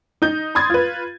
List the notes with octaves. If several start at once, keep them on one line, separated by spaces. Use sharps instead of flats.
D#4 G6
B5 C6 D#6 G#6 A6
F4 B4